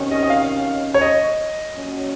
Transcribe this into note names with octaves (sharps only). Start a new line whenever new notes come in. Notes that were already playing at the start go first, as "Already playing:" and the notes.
Already playing: C3 D#3 F#3 C#4
D#5
D#5
F5
C#5
D#5
A#2 F#3 C#4